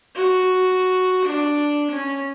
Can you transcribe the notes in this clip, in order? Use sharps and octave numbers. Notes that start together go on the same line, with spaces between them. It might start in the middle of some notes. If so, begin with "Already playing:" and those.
F#4
D4
C#4